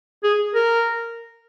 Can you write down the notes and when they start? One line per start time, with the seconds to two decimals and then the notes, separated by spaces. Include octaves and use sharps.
0.24 G#4
0.55 A#4